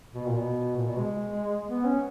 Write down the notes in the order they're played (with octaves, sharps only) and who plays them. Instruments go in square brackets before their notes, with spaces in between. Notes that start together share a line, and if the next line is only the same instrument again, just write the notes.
[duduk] B2
A#2
B2
A#2
B2
G#3
B3
C#4